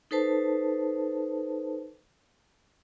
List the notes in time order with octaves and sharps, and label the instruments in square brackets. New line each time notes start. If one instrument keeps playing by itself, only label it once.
[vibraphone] D#4 A4 B4 C5 A5